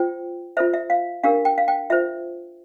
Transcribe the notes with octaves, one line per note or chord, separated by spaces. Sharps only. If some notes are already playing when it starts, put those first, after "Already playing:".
Already playing: F4 C5 G5
F4 A4 C5 E5
E5
F5
D4 G4 A#4 F5
G5
F5
G5
F4 C5 E5